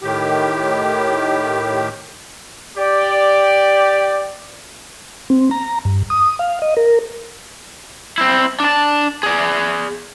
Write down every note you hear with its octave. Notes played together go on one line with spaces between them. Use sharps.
A2 D#3 G4
G4 D5
C4
A#5
G2
D#6
F5
D#5
A#4
C4 E4
D4 A5
G#4 D5